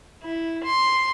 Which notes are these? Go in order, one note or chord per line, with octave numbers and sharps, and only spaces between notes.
E4
C6